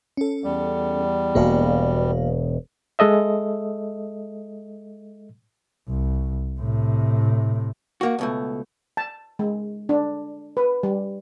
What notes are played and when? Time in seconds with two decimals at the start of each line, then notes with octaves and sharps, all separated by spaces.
0.17 C#4 A4
0.44 E2 G3
1.35 E1 B2 A#3 F#4 F5
2.99 G#3 A4 D#5 E5
5.88 C2
6.60 A2 C3
8.01 A#3 F#4
8.19 C#2 B2 A3
8.97 A5
9.39 G#3
9.89 D4
10.57 B4
10.83 G3